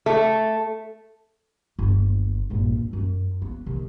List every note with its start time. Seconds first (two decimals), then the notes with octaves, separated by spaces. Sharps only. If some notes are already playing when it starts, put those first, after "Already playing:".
0.06 A3
1.79 G1 D#2
2.50 A#1 G2
2.72 C4
2.93 F#2
3.42 B3
3.66 C3 D#3